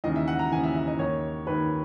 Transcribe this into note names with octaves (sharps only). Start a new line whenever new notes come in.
D#2 C#3 E3 D#5
E5
F#5
A#5
D#2 C#3 E3 G#5
E5
E5
D#5
D#2 D#3 C#5
D#2 D#3 B4